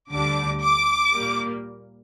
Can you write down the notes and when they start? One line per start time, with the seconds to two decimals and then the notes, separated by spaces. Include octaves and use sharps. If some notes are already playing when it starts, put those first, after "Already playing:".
0.11 D2 D3 G3 D4 D6
0.62 D6
1.14 A#2 G3 A#3